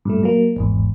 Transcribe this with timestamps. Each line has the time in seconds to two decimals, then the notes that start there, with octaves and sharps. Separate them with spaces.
0.05 G2 A#2 A3
0.23 F#3 A#3
0.56 G#1 E2 G#2